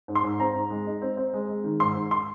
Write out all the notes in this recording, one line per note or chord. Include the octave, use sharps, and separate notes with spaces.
G#2
C6
G#2
C4 A#5
G#2
G#3
D#4
C4
C4
G#3
G#3
D#3
G#2 C6
G#2
C6